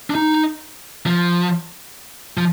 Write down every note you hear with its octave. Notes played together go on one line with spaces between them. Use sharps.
D4
D#4
F3
F3